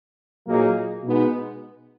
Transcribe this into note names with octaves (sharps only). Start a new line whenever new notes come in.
A#2 F#3 A#3 D#4 G#4
B2 G#3 B3 D#4